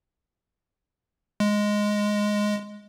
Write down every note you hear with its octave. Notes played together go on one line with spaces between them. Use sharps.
G#3